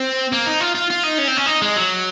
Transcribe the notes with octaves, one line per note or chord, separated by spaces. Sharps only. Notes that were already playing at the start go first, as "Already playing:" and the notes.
Already playing: C4
A#3
D#4
F4
F4
F4
D#4
C#4
C4
C#4
D#4
G#3
F#3